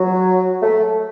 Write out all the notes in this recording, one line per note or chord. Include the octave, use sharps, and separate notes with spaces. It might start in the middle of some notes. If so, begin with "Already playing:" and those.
Already playing: F#3
A3